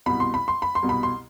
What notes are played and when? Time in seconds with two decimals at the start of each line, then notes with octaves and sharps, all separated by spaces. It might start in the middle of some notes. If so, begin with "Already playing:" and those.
0.06 C2 B2 B5
0.20 C6
0.34 B5
0.48 C6
0.62 B5
0.75 C6
0.83 C2 B2
0.89 B5
1.03 C6